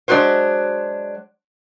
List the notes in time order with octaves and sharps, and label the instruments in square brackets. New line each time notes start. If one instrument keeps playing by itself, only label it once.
[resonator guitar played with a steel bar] F#3 G#3 D4 F#4 B4 C5